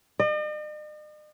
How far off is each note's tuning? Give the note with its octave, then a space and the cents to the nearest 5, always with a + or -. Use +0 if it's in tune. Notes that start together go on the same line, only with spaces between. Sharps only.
D#5 -45